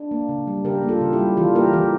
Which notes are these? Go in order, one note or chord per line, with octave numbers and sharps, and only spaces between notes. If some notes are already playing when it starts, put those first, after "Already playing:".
Already playing: D4
A#3
C#3
G3
C#3 G4 A#4
A#3
F4 A4
C#3
E4 G4
G3
E3 F4 A4
A#3 G4 A#4
E3 G4 A#4